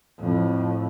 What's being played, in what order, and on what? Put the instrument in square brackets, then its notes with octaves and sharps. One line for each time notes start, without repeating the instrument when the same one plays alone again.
[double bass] F2 A2